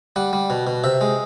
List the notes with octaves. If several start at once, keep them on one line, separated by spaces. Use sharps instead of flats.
G3 F#5
G3
B2
B2
C3 E5
G#3